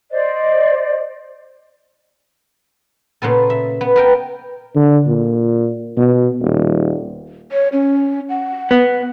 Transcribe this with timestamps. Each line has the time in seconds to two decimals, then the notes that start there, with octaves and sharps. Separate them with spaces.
0.11 C5 D5 D#5
3.22 A#2 C#3 B3 A4
3.50 E5
3.81 B3
3.96 B3 A#4 G5
4.75 D3
5.07 A#2
5.97 B2
6.42 D#1
7.52 C#5
7.73 C#4
8.29 F#5
8.71 B3